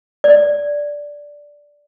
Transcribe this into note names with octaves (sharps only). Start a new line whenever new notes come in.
D5